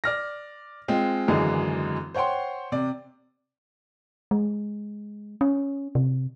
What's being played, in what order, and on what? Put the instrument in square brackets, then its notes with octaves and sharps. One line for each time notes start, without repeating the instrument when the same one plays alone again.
[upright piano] D5 F6 A#6
G#3 C4 F4
G#1 F#2 D3 E3 G#3 G#4
C5 C#5 F#5 G5 C6
C3 D5
[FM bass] G#3
C#4
C3